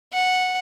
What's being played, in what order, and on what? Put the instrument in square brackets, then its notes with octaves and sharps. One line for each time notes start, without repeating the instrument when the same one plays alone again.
[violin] F#5